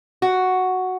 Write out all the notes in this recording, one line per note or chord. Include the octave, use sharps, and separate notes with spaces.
F#4